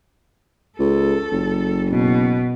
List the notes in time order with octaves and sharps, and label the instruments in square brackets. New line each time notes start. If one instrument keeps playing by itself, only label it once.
[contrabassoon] C#2 [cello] A4
[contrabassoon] F#1
[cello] B2